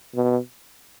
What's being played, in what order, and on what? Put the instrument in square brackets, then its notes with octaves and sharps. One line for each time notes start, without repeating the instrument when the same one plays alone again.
[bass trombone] B2